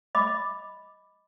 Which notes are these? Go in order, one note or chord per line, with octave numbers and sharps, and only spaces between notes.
D#5 B5 D6